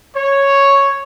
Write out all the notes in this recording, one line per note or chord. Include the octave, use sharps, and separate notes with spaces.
C#5